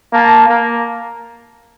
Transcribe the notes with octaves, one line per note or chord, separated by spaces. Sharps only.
A#3 F5 A5
A#3